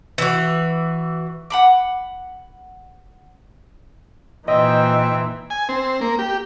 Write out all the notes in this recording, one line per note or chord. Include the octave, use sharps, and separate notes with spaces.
E3 F#4
F#5 B5 D6
A#2 E3 C4 D#4 D#5 E5 G5
G#5
C4
A#3
G4